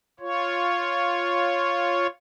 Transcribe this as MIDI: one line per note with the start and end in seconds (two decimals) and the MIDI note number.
0.20 2.07 65
0.20 2.07 73